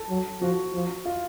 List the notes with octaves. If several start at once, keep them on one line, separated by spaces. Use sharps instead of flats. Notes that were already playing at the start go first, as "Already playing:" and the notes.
Already playing: A4
F#3
F3 F#4
F3
F4